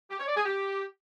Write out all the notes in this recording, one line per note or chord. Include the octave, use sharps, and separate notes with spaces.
G4
C#5
D5
G#4
G4